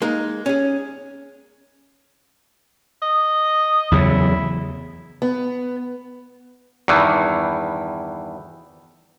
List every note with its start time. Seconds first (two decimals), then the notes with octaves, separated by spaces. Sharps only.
0.02 G#3 A#3 D#4 A#4
0.46 C#4 G#4
3.02 D#5
3.92 E2 C#3 F#3 E4
5.22 B3
6.88 E2 G2 D#3 E3